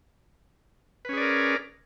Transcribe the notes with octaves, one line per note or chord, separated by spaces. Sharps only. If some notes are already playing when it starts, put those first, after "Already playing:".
C#4 G#4 A#4 B4 D5